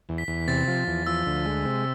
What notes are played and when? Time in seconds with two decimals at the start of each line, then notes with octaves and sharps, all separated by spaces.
0.09 E2
0.18 B6
0.28 E2
0.48 C3 A6
0.68 F3
0.87 E2
1.07 F3 E6
1.26 D2
1.46 G#3
1.65 C3